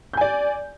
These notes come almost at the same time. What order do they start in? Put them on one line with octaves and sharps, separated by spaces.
G6 G#5 D5